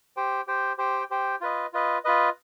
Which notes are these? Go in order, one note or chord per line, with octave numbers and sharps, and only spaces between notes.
G4 C5 G5
G4 C5 G5
G4 C5 G5
G4 C5 G5
F4 B4 D#5
F4 B4 D#5
F4 B4 D#5